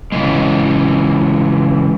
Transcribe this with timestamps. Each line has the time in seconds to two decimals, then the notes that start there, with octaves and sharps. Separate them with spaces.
0.12 C#3 E3 G#3